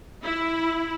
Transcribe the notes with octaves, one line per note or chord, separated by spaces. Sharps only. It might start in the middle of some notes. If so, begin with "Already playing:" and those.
E4